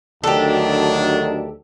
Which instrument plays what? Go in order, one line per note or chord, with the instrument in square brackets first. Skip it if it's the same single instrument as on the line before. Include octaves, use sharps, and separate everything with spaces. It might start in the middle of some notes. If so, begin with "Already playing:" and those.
[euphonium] D2 [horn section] D#3 F#3 D4 [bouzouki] G4 A4